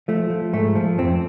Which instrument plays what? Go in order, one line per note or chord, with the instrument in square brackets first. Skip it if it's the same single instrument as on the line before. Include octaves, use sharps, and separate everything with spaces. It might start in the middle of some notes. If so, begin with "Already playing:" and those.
[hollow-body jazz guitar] F3 A3
F3
G#2 A3
F3
F2 C4